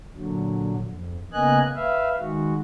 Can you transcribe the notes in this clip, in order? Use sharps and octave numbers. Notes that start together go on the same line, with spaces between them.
A#2 D3 F#3
F2
C#3 A#3 B3 D#5 G#5 F#6
B4 E5 F5
D#3 G#3 F#4